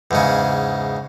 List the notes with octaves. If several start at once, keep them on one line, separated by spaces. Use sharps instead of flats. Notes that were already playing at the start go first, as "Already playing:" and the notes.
E2 G#2 C#3